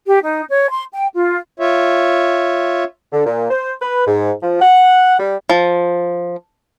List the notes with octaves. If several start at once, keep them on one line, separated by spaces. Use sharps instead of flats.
G4
D#4
C#5
C6
G5
F4
F4 C#5 E5
D3
A#2
C5
B4
G#2
F3
F#5
G3
F3